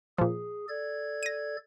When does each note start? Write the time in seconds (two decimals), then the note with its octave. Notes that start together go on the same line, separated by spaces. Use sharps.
0.18 A#2 F3 G#4
0.69 A4 D5 G#6
1.23 A#6 D#7